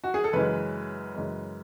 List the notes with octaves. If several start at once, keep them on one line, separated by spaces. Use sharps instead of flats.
F#4
G#4
A4
F#2 C#3 E3 G#3 B4
F#2 C#3 E3 G#3